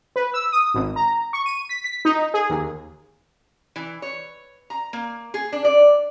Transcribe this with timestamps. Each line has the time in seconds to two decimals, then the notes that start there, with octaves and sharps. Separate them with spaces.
0.16 B4
0.34 E6
0.52 D#6
0.74 G#1
0.96 A#5
1.33 C#6
1.46 D#7
1.69 B6
1.84 B6
2.05 D#4
2.34 G#4
2.50 D#2
3.76 E3
4.02 C#5
4.70 A#5
4.93 A#3
5.34 G#4
5.53 D4
5.65 D5